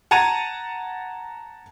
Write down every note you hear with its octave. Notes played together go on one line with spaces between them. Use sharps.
F#5 A5 A#5 G#6 D#7 F7